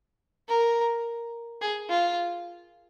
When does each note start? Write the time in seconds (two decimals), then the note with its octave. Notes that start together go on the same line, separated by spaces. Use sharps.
0.48 A#4
1.61 G#4
1.90 F4